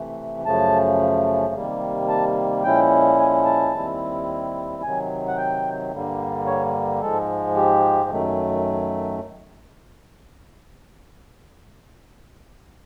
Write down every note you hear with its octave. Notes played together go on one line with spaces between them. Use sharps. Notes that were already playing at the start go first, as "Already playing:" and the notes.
Already playing: C3 E3 A3
F#2 C#3 F3 A3 A5
C3 D#3 G3 A#3
A5
A#2 F3 G#3 C#4 E4 G5
G#5
A5
D#2 D#3 G3 C4 E4
C3 D#3 F#3 G#5
F#5
G5
G2 D3 G3 A#3
C#5
G#2 F3 G#3 A4
G4
F#2 D#3 F#3 A3